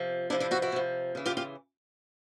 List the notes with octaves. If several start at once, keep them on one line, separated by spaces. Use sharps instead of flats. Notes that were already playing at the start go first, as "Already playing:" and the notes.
Already playing: C3 F3
C3 F3 D4 E4
D4 E4
E4 F#4
E4 F#4
C3 F3
C#3 E3
F4 G4
F4 G4